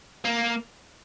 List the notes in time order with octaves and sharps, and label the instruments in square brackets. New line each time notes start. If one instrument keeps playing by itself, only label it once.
[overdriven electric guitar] A#3